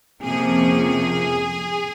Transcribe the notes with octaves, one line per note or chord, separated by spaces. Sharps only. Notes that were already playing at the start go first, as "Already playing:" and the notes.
F2 C3 F3 A#3 C#4 G#4